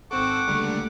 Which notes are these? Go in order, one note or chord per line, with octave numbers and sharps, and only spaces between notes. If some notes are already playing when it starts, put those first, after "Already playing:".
G#1 C4 A4 F#5 C#6 D6
C#2 D3 G3 A3 A#3 A4